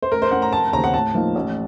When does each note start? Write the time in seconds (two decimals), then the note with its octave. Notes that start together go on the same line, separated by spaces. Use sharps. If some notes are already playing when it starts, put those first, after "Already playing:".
0.02 C5
0.11 A1 A#4
0.22 C5
0.31 A2 A3 C#4 F#5
0.42 A#5
0.52 F1 A5
0.73 D#2 C#3 A3 C4 A#5
0.84 F#5
0.94 A2 A5
1.14 F3 A#3 D#4
1.35 A1